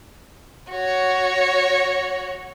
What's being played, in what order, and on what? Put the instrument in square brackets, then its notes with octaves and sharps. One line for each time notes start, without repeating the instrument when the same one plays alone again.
[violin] F#4 C#5